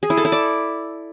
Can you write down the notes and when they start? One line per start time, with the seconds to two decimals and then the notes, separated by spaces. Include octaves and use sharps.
0.03 G#4
0.10 E4
0.17 A4
0.25 E4
0.32 D5